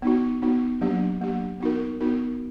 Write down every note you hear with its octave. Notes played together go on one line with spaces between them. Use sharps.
B3 D#4 F#4
B3 D#4 F#4
F#3 A#3 D4 G4
F#3 A#3 D4 G4
B3 D#4 F#4 A#4
B3 D#4 F#4 A#4